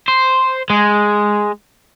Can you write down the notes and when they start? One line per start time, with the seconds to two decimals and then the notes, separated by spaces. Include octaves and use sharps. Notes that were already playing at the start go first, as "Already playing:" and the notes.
0.08 C5
0.70 G#3